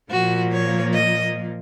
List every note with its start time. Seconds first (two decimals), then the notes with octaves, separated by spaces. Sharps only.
0.11 A#2 F3 A#3 F#4
0.52 C#5
0.94 D#5